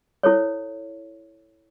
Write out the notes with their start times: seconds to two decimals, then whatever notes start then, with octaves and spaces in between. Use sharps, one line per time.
0.23 E4 A4 C5 C#5